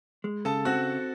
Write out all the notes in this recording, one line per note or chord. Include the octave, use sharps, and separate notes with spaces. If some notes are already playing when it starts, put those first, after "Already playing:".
G#3
C#3 A4 A5
C4 F#4 F#5